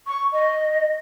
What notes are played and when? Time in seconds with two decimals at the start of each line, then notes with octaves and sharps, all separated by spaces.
0.07 C#6
0.33 D#5